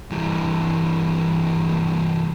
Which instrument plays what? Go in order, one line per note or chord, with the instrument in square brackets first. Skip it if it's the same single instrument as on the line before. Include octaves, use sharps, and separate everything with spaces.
[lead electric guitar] G2 E3